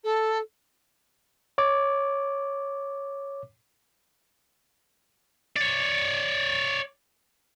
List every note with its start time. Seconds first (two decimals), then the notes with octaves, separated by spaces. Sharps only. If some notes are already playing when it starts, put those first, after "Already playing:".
0.03 A4
1.58 C#5 D6
5.57 C#5 D5